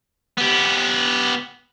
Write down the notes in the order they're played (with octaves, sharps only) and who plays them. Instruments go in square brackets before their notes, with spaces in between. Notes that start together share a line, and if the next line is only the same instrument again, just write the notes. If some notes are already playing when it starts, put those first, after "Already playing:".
[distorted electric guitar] B3 G4